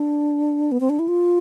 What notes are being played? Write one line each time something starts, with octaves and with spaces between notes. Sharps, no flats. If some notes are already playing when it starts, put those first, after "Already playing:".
Already playing: D4
B3
C4
D4
E4
F4